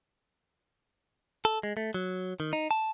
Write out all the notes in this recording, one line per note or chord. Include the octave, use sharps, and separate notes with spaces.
A4
G#3
A3
F#3
D#3
D#4
A5